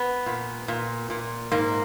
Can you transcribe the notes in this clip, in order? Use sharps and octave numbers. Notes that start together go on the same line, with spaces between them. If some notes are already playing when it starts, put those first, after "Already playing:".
Already playing: B3
A#2
A#2
A#2
G#2 A#3